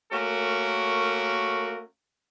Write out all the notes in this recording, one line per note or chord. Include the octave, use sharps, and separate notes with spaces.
A3 A#3 C#4 F#4 A#4